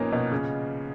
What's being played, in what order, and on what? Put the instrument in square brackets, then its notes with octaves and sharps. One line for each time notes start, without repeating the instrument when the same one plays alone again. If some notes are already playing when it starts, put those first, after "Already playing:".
Already playing: [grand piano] A#2 F3 B3 [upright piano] A#3 C#4 D#4
[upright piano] B2
C#3